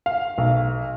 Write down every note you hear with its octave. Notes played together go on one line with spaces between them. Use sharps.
F5
B1